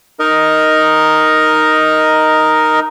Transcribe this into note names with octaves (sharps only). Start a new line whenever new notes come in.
D#4 A#4 D#5